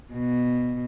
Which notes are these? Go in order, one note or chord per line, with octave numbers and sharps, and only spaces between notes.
B2